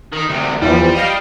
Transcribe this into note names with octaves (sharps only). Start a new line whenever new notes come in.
D#3 D#4
D2 C3
E2 E3 F3 G3
D#5 F5 G5